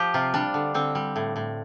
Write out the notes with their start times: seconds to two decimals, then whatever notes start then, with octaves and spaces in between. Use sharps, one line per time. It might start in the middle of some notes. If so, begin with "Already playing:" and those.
Already playing: F3 G4
0.14 C3 F4
0.34 G3 D4
0.54 D3
0.74 D3 C4
0.95 G3
1.16 A2
1.36 A2